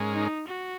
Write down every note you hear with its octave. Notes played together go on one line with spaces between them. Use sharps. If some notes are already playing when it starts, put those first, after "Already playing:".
Already playing: G#2 G#3 C#4 A#4
D#4
F#4